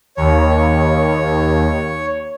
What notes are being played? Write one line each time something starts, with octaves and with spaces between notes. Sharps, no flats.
D#2 C#5